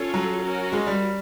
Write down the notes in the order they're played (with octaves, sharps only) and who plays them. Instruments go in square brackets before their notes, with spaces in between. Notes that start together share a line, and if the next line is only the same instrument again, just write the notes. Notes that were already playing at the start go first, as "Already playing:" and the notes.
Already playing: [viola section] C#4 F4 A4 C#5
[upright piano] F#3
[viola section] C#4 F#4 A#4
[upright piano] G#3
G3